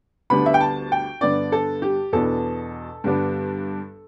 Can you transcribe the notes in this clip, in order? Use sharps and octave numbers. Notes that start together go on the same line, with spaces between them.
D2 D3 G3 B3 D4 B5
E5
G5
A5
G5
G2 D3 B3 D5
A4
G4
E2 B2 B3 D4 A4
G2 D3 G3 B3 D4